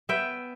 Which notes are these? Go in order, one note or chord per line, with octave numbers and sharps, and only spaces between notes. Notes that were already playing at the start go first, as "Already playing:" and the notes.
B3 E5 G5